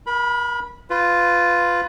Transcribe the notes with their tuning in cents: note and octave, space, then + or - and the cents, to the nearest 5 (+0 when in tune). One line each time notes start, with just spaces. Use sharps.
A#4 +35 B5 -15
F4 +0 B4 +20